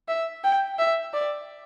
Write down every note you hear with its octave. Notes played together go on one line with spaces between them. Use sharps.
E5
G5
E5
D5